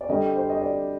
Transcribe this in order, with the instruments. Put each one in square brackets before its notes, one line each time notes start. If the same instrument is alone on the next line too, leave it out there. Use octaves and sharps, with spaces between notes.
[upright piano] D5
D3 G3 D#5
C5
D#5
D5